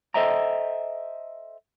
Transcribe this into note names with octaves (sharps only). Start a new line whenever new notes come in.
A4 C5 D#5 E5 G5 A#5